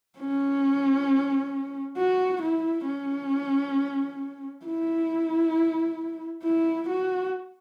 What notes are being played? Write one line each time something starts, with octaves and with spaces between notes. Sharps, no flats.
C#4
F#4
E4
C#4
E4
E4
F#4